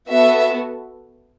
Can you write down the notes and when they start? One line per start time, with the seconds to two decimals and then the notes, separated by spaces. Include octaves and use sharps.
0.10 B3 F#4 A4 E5